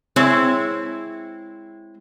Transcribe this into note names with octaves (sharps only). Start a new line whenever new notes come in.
G#3 C4 E4 C#5